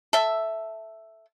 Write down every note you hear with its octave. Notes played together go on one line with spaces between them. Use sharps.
A4 E5